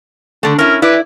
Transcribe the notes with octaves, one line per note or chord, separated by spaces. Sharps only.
D3 A3 D4
C#4 E4 A#4
E4 B4 D5